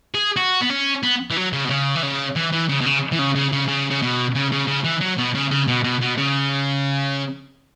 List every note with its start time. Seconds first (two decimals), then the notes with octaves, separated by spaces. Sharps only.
0.14 G#4
0.37 F#4
0.61 B3
0.70 C#4
1.03 B3
1.31 E3
1.36 F#3
1.53 C#3
1.65 B2
1.70 C#3
1.95 E3
2.03 C#3
2.36 E3
2.53 E3
2.69 C#3
2.81 B2
2.86 C#3
3.12 E3
3.19 C#3
3.35 C#3
3.53 C#3
3.68 C#3
3.90 C#3
4.02 B2
4.35 C#3
4.52 C#3
4.68 C#3
4.85 E3
5.01 F#3
5.18 B2
5.34 C#3
5.51 C#3
5.68 B2
5.84 B2
6.01 B2
6.17 C#3